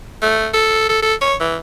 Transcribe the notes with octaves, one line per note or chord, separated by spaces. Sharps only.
A3
A4
A4
A4
C#5
E3